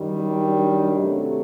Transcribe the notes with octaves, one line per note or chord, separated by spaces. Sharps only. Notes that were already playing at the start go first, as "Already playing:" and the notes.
Already playing: F#2 D#3 G3
D4
C3 F#3 A3